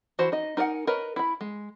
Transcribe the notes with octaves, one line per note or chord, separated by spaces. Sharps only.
E3 F#4 C5 A5
D#4 D#5
D#4 A#4 D5 F#5 G#5
A#4 B4 C#5 D#5
E4 B5
G#3